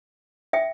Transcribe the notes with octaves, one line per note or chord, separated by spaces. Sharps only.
E5 G5